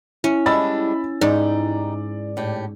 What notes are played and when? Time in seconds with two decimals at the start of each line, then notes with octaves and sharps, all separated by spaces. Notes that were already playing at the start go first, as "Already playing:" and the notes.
0.24 C#4 E4
0.46 G3 G#3 D4 B5 E6 A6
1.21 G#2 G3 D#4 D5
2.37 A2 G4